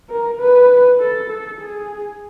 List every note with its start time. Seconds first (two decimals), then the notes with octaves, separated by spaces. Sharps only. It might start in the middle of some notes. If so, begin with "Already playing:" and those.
0.10 A#4
0.39 B4
1.00 A4
1.30 A4
1.61 G#4